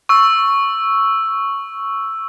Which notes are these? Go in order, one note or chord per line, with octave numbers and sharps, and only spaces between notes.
C#6 E6